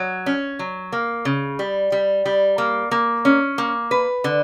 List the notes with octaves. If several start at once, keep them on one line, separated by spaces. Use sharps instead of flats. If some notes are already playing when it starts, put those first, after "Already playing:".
Already playing: F#3
C#4
F#3
A#3
C#3
G3
G3
G3
A#3
A#3
C#4
A#3
B4
D3